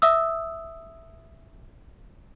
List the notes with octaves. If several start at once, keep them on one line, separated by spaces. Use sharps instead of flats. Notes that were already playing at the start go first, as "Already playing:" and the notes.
E5 D#6 E6